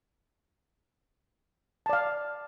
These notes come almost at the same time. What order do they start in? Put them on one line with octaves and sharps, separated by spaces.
A5 D5 F5